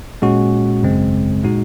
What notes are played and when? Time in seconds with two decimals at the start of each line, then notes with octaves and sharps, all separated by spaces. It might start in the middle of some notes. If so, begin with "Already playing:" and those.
0.22 A#2 G#3 C#4 F#4
0.83 G#1 F#2 C#3 G#3 C4
1.44 A#2 G#3 D#4 F#4